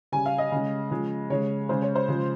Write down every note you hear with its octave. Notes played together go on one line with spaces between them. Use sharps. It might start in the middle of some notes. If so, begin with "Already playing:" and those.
C#3 G3 G#5
F5
D#5
C#3 G#3
C#3 F3 G#3
C#3 G#3 C#5
C#3 G#3 C5
C#5
C5
C#3 F3 G#3